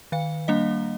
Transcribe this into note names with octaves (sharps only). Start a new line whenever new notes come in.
D#3 F5
G3 A#3 D4 D#5